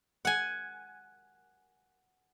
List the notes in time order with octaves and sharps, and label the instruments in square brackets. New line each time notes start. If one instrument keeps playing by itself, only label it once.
[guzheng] F#5 G#5